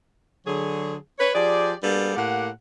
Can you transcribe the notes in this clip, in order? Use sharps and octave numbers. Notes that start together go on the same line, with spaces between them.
D3 F#3 G#4
B4 C#5
F3 G4 G#4 D5
G3 A#3 B3 D4 G#4 A4
A2 A#3 G4 F#5